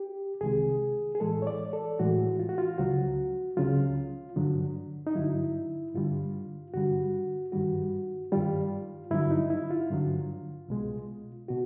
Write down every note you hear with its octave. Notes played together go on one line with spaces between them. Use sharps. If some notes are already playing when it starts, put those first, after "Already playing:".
Already playing: G4
C2 C3 D#3 G#3 G#4
G#4
A2 E3 G#3 A4
C#5
D5
A4
A2 E3 G#3 F#4
F4
F#4
F4
C#2 C#3 F#3 F#4
C#2 C#3 F#3 F4
G2 D3 F#3
D#4
G2 D3 F#3 E4
G2 D3 G3 F4
G2 D3 G3 F#4
G2 D#3 G3 F#4
G2 D#3 G3 F4
G2 D3 F#3 E4
D#4
E4
F4
G2 D3 F#3
C2 B2 G#3
B2 F#4